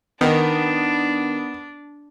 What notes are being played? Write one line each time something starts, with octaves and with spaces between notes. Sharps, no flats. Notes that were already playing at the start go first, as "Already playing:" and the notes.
D#3 B3 D4